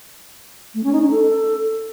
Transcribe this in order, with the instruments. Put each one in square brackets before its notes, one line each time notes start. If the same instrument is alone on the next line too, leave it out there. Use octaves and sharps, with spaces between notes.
[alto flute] A3
C#4
D#4
C#4
A4